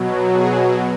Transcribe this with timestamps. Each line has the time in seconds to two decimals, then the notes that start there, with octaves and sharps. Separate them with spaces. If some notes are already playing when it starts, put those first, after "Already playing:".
Already playing: B2 F#3
0.33 G#4